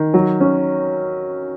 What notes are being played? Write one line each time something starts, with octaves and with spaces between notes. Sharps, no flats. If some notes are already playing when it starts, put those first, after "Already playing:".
Already playing: D#3
F#3
C#4